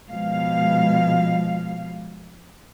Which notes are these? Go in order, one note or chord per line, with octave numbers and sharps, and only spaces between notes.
B2 F3 G#3 F5